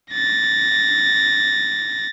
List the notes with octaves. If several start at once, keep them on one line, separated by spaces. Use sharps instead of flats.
A6 A#6